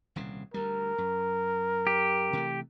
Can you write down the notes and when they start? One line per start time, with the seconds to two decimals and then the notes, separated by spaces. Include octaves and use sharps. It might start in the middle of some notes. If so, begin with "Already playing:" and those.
0.16 D#1 C2 C#3
0.54 D2 G3 A#4
0.98 F#2
1.87 G4
2.33 C3 E3 A3